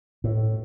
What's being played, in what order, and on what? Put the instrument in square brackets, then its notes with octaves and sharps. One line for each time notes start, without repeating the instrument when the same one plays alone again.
[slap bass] A2